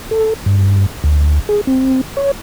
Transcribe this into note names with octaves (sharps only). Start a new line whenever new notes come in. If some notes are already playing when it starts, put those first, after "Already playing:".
A4
G2
D2
G#4
C4
C#5